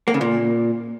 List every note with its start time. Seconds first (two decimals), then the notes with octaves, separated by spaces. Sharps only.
0.08 A#3
0.14 C#3
0.21 A#2